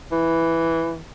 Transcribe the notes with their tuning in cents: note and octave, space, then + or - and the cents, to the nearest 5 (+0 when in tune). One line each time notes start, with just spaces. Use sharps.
E3 +0